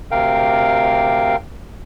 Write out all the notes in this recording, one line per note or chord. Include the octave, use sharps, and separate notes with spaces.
D2 C3 A#4 F5 G5